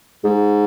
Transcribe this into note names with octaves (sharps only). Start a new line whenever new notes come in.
G#2